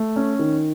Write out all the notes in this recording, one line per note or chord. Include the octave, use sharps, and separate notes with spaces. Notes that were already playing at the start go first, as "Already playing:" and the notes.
Already playing: A3
C#4
D#3